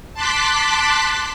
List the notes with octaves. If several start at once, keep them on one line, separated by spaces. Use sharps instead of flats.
A5 C6 D6 F#6 B6